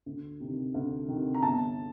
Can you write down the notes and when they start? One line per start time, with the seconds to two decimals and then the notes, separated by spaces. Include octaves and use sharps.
0.06 D2
0.40 C3 D#3
0.74 D2
1.08 C3 D#3
1.34 A#5
1.42 G1 A5